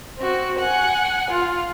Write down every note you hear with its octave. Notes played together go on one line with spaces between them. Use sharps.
C4 F#4
F#5 G#5
F4